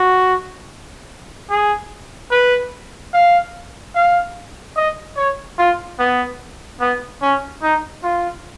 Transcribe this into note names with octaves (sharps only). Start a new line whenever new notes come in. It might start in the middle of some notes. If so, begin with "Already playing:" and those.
Already playing: F#4
G#4
B4
F5
F5
D#5
C#5
F4
B3
B3
C#4
D#4
F4